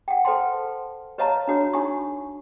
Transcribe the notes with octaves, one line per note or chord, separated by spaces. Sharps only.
F#5 G5
A4 B4 C5 G5 A5 C6
B4 C#5 D#5 F5 A5 A#5
D4 F#4 C#5
D#4 F#4 G#5 C#6